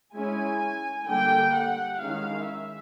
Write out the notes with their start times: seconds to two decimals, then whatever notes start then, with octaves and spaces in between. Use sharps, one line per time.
0.14 G#3 C#4 E4 G#5
1.07 D3 G3 A#3 G5
1.53 F#5
1.99 D#3 G#3 C#4 E4 F5
2.45 E5